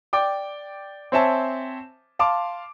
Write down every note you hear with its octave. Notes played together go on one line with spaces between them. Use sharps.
D5 G5 D6
C4 C5 C#5 E5 G#5 A5
F5 A5 C6 D6